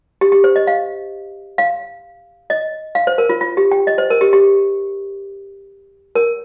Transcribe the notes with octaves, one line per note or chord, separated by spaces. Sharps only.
G4
G4
C5
D#5
F5
F5
D#5
F5
C5
A#4
F4
F4
G4
G5
D#5
C5
A#4
G4
G4
A#4